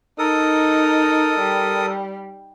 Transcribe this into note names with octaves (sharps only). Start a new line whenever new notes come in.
D#4 A4 A#4 D#6
G3